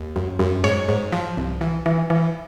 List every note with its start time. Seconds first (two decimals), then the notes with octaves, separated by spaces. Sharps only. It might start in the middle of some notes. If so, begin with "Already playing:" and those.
Already playing: D#2
0.16 F#2
0.39 F#2
0.64 G#2 C#5
0.88 G#2
1.12 F3
1.37 C2
1.61 E3
1.86 E3
2.10 E3